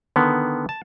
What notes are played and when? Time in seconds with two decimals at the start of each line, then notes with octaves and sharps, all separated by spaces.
0.16 D3 D#3 B3
0.69 A5